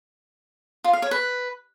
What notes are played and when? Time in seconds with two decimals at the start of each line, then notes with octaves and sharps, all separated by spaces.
0.84 F4
0.93 F5
1.02 C#5
1.11 B4